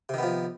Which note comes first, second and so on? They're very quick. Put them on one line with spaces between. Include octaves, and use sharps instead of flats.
C3 D#3 B3 F3